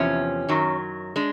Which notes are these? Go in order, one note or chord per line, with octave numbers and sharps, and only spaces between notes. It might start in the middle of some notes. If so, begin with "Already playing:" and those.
Already playing: E2 C3 F3 C#4
F#2 D#3 F#3
G#3 D4